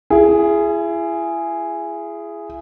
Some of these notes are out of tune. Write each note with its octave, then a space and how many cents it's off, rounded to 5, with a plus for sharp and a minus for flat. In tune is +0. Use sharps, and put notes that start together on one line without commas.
E4 +35 G#4 +0